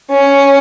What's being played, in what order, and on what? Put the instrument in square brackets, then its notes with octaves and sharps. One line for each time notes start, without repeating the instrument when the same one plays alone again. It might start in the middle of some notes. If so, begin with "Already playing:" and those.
[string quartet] C#4